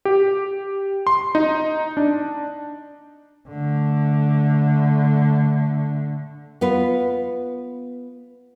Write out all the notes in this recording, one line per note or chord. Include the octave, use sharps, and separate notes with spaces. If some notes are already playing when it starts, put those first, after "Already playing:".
G4
C6
D#4
D4
D3 A3
B3 F4 B4